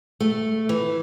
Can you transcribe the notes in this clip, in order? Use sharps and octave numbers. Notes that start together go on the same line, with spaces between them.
A3
E3